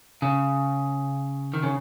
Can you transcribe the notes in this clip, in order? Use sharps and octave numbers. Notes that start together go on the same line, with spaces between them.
C#3
D#3
C#3